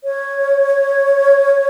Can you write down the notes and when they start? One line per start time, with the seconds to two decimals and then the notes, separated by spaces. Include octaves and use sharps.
0.04 C#5